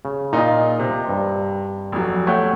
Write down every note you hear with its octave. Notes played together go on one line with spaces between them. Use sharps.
C#3
A#2 D#4 F4 D#5
C3
G2
F1 F#3
A3 C#5 F#5 G5